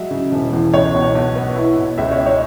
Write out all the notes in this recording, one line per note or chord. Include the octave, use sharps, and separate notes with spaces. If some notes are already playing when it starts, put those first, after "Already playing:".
Already playing: F#3 G#3 E5
C#3
E1
E2
C#2 C#5
B2
B1
B3
E4
B2
C#2 E5
C#5
G#3
C#5